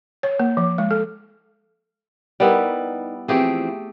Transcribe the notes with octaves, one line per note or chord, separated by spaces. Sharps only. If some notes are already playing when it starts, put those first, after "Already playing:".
C#5
A#3
F3
G#3
A4
G3 B3 D#4 E4 A#4 D#5
E3 F3 A3 C4 G4 G#4